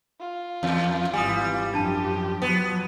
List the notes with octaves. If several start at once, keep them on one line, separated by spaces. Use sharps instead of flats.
F4
E2
G#1 E3 G3 G#5 D#6
F#2 F3 D4 G4 A5 D#7
F3 F#3 B3